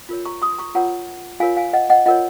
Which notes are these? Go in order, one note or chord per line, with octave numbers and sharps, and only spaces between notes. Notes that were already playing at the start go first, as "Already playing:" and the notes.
F4 A#4 C#5
A#5 C#6
C6 D#6
A#5 C#6
F4 A#4 C#5 F#5 A#5
F4 A#4 C#5 F5 G#5
F5 G#5
D#5 F#5
D#5 F#5
F4 A#4 C#5 D#5 F#5